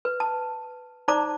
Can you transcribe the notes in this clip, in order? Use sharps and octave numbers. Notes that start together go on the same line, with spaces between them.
B4
A5
D#4 C5 D5 A5 A#5 D6